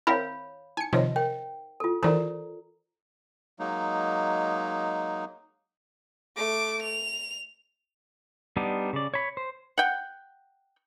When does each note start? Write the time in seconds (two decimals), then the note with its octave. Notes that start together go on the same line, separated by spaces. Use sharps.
0.07 C4 E4 A#4 C#5 F5 B5
0.77 D#4 G#5 C#7
0.93 C3 D#3 F3 C5 C#5 D#5
1.16 A#4 G5
1.80 F4 A4
2.03 D#3 E3 E4 A4 A#4 C5 D5 A#5
3.60 F#3 G#3 A#3 D#4
6.36 A3 D6
6.83 F7
8.57 G3 B3 D4 D#4
8.93 C#3 D5
9.14 C#5 B5
9.37 C5
9.78 F#5 G5